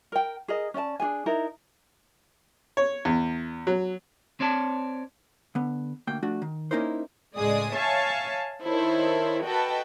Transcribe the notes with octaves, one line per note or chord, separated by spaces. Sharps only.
A#4 G5
G#4 A#4 D#5
C#4 D5 D#5 A5
D4 D#4 G#4 G#5
D#4 E4 A#4
C#5
E2
F#3
C4 C#5 D5 A5
D3 B3
D2 A#3 G5
F3 A3 D4 F#4
D#3
A#3 C#4 D#4 E4 A#4 C5
C#2 A2 G#3 G#4 D5 D#6
C#5 E5 F5 G#5 A5 C#6
D#3 E4 A4 C5 C#5
F#4 A4 B4 D#5 G5 A5